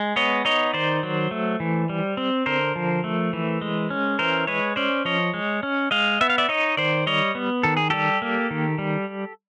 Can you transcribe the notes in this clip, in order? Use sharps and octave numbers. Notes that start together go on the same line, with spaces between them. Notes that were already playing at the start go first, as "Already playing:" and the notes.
Already playing: G#3
B3 C#5 D#5
D#4 C#5 D#5
D#3 C5 D5
F#3
A3
E3
G3
C4
D3 A#4 C5
F3
A3
E3
G#3
C#4
E3 A#4 C5
G#3 B4 C#5
C#4 C5 D5
F3 C#5 D#5
G#3
C#4
G#3 D#5 F5
B3 E5
F5
D5 E5
D#4 C#5 D#5
D#3 C5 D5
G3 C#5 D#5
B3
D#3 A4
G#4
G3 G4 A4
A#3
D#3
G3